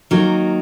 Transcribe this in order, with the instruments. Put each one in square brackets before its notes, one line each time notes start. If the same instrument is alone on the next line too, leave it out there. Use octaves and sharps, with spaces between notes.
[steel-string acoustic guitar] D#3 F#3 A#3 D#4 A#4